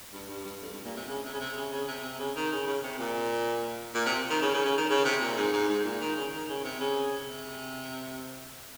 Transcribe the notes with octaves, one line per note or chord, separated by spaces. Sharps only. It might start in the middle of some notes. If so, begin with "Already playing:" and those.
G2
G2
G2
F2
G2
A#2
C3
C#3
C3
C#3
C3
C#3
C#3
C3
C3
C#3
D#3
C#3
C#3
C3
A#2
A#2
C3
D#3
C#3
C#3
C#3
D#3
C#3
C3
A#2
G#2
G#2
G#2
A#2
D#3
C#3
D#3
C#3
C3
C#3
C3